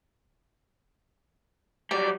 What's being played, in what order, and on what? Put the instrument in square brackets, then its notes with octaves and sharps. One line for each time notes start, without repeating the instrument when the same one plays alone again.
[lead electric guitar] F#3 G3 [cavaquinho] D5